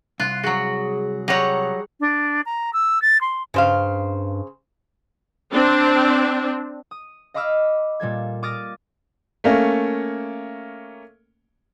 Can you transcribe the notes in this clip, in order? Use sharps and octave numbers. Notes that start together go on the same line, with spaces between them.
C2 F4 F#6
F#3 F#4 G#4
F#3 G3 C#5 F#5 A#5
D4
A#5
E6
A6
C6
G2 C#3 C5 F5
C4 D4
D#6
D#5 F5 B5 D6 E6 F6
A#2 G3 A4 G#6
D6 D#6 F6 A6 A#6 D7
A3 A#3 C#4